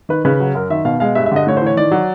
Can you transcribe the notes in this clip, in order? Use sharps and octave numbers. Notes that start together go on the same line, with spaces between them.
D#3 B4
C#3 B4
F#3
F#2 A#4
D#3 E5
B2 F5
G#3 F5
G2 E5
E5
D3 D#5
A2 C#5
C5
E3
C#5
D#3 D5
F#3